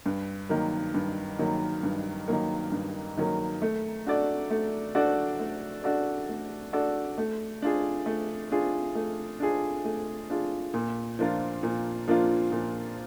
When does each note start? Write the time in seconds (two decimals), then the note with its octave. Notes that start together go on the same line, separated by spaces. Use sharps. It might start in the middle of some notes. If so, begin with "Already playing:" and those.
0.06 G2
0.49 D#3 F#3 A#3
0.94 G2
1.39 D#3 F#3 A#3
1.83 G2
2.28 D#3 F#3 A#3
2.72 G2
3.17 D#3 F#3 A#3
3.62 A3
4.06 D4 F#4 A4 D5
4.50 A3
4.95 D4 F#4 A4 D5
5.40 A3
5.84 D4 F#4 A4 D5
6.29 A3
6.73 D4 F#4 A4 D5
7.18 A3
7.62 D4 F4 G#4
8.06 A3
8.52 D4 F4 G#4
8.95 A3
9.40 D4 F4 G#4
9.84 A3
10.30 D4 F4 G#4
10.74 A#2
11.19 F3 A#3 D4 F4
11.63 A#2
12.08 F3 A#3 D4 F4
12.52 A#2